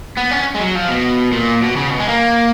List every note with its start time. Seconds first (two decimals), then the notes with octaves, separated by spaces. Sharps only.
0.17 B3
0.32 C#4
0.55 G#3
0.60 F#3
0.75 F3
0.89 B2
1.32 A#2
1.62 B2
1.76 C#3
1.90 B2
1.99 G#3
2.09 A#3